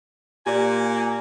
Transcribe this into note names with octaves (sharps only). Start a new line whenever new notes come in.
A#2 G4 D5 G#5